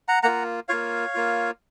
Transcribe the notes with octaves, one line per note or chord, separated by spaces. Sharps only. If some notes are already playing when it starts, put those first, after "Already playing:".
F#5 A#5
A#3 F4 F#5 A#5
A#3 F4 C#5 F5
A#3 F4